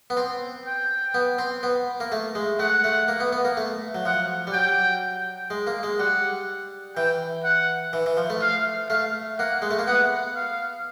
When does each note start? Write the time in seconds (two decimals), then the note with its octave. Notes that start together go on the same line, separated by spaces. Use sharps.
0.10 B3
0.17 C4
0.66 G5
1.14 B3
1.38 C4
1.63 B3
2.00 A#3
2.12 A3
2.35 G#3
2.59 A3 F#5
2.84 A3
3.08 A#3
3.20 B3
3.32 B3
3.45 A#3
3.57 A3
3.94 F#3
4.05 F3 F#5
4.47 G3
4.53 F#3 G5
5.50 G#3
5.67 A#3
5.83 G#3
5.99 G3 F#5
6.96 E3 G5
7.44 F#5
7.93 E3
8.06 E3
8.17 F3
8.30 A3
8.42 F5
8.90 A3 F5
9.39 A#3 F#5
9.62 G#3
9.71 A3
9.79 A#3
9.87 B3 F#5
10.36 F5